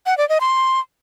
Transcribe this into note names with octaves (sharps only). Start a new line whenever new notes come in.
F#5
D5
D#5
C6